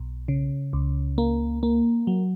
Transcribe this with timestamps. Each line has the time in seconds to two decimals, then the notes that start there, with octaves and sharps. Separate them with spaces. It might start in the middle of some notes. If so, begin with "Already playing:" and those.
Already playing: B1
0.28 C#3
0.73 C#2
1.18 A#3
1.63 A#3
2.07 F#3